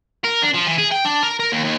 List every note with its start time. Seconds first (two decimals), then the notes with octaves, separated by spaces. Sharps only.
0.24 A#4
0.42 D4
0.54 F3
0.67 E3
0.78 G#4
0.91 G5
1.05 D4
1.23 A#4
1.40 A#4
1.52 D#2
1.64 D#2